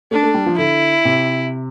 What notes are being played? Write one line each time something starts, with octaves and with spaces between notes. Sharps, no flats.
A3 D4
A3
G3
F3
D3 E4
C3